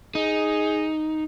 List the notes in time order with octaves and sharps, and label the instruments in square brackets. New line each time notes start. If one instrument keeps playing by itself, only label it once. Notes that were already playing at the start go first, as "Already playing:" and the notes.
[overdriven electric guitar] D#4 [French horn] G#4